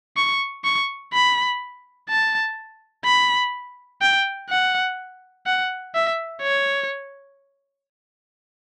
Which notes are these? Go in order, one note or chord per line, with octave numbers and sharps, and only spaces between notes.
C#6
C#6
B5
A5
B5
G5
F#5
F#5
E5
C#5